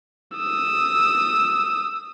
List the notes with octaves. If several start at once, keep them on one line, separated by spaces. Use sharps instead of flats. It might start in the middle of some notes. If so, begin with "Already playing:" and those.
D#6 E6